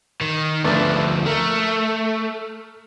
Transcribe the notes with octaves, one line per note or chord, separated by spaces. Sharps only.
D#3
D2 F3 A3 B3 D4
A3 A#4